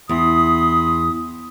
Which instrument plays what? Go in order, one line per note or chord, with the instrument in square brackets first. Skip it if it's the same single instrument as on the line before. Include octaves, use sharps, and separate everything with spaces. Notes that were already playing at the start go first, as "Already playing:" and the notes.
[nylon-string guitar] E2 [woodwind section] B5 C6 D#6